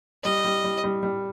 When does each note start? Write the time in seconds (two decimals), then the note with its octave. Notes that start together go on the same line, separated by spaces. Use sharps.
0.24 G3 D#5
0.45 G3
0.64 G3
0.84 G3
1.03 G3